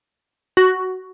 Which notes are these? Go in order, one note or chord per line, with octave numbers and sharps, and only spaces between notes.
F#4